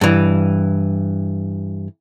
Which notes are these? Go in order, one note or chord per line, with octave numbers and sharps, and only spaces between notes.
G2 E3